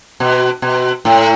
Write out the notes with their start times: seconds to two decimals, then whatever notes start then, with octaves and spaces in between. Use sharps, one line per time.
0.20 B2
0.62 B2
1.05 A2